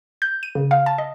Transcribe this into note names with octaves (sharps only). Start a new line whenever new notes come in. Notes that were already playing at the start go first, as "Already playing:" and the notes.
G6
D#7
C#3
F5
A5
D#5